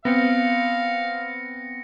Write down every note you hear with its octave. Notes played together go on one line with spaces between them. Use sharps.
B3 C4 F5 A#6 C#7